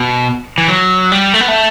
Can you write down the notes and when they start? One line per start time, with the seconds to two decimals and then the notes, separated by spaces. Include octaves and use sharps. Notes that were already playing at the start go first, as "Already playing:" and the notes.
Already playing: B2
0.58 E3
0.68 F#3
1.12 G3
1.34 A3
1.41 B3
1.48 A3